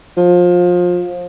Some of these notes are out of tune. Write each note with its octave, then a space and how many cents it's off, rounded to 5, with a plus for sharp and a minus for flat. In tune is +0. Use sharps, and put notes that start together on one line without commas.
F3 +25